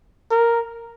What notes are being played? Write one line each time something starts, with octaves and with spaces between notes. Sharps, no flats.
A#4